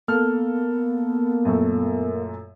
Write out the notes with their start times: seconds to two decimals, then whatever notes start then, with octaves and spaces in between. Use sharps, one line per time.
0.08 A#3 B3 A4 F6
1.45 F#2 A#2 A3